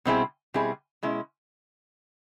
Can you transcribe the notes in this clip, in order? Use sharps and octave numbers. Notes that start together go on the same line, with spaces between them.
B2 G3 C4 E4 G#4
B2 G3 C4 E4 G#4
B2 G#3 C#4 E4